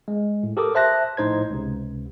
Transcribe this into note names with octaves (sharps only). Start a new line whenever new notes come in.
G#3
A2
G4 A4 A#4 D6 D#6
C5 E5 A5 F#6 A#6
A#1 A2 D#4 C5 G#6
C#2 C3